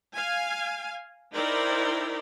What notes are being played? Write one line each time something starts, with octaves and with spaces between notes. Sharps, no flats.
F5 G#5
D#4 E4 A#4 C5 D5 G5